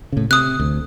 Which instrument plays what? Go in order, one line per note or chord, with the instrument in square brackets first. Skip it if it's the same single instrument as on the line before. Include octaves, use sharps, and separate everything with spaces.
[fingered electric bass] A2 C#3
[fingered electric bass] C3 [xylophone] D#6 F#6
[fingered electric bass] D2